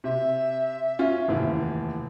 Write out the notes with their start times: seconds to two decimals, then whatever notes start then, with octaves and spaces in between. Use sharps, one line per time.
0.04 C3 E5
0.99 C#4 F4
1.28 F1 D#2 E3